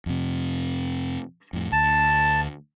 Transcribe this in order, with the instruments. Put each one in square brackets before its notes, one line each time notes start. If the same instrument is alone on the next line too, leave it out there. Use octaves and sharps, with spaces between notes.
[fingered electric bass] F2 C3
F2 A2
[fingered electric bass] D2 [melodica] A5